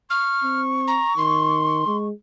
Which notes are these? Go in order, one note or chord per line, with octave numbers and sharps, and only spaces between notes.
C#6 F6
C4
A#5
D#3 C6
G#3